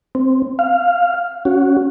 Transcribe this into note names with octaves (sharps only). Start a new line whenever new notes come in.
C4
F5
C#4 F#4